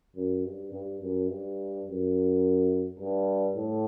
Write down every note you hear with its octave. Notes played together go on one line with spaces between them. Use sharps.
F#2
G2
G2
F#2
G2
F#2
G2
A2